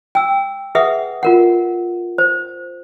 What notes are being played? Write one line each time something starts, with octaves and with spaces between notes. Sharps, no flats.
G5 E6
G#4 B4 E5 F#5 D#6
F4 A#4 F#5
C5